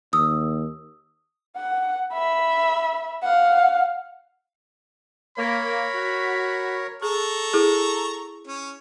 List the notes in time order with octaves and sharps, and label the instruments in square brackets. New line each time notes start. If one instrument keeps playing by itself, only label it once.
[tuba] D#2 [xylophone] D#6 E6
[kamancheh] F#5
E5 B5
F5 F#5
[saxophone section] A#3 [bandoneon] A#4 C#5 [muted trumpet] B5
[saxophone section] F#4
[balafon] G#4 [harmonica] A4 A#5 C#6
[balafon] E4 G#4
[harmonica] C#4